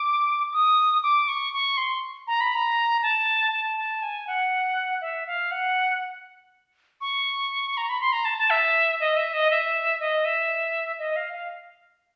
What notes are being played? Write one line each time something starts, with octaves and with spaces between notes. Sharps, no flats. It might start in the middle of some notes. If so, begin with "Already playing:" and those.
Already playing: D6
D#6
D6
C#6
C#6
C6
A#5
B5
A#5
A5
A5
A5
G#5
F#5
E5
F5
F#5
C#6
A#5
B5
C6
A#5
A5
A5
E5
D#5
E5
D#5
E5
D#5
E5
D#5
F5
F5